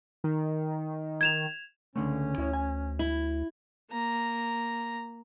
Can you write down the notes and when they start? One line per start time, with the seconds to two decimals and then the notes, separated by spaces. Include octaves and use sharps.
0.24 D#3
1.21 G#6 E7 F7
1.96 C#2 D3 A3 C#4
2.38 D2 E4 C#5
2.53 G#5
2.99 E4
3.91 A#3 A#5